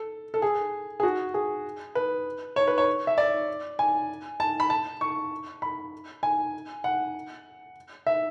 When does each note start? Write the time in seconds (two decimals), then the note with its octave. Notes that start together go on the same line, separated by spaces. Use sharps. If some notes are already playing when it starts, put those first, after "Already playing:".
Already playing: A4
0.34 A4
0.42 G#4
1.00 G#4
1.03 F#4
1.34 G#4
1.95 B4
2.56 C#5
2.68 B4
2.78 C#5
3.07 E5
3.18 D5
3.79 G#5
4.40 A5
4.60 B5
4.70 A5
5.01 C#6
5.62 B5
6.23 G#5
6.84 F#5
8.07 E5